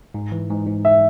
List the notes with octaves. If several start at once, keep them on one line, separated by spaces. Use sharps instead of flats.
G#2
E3
G#2
G#2
E5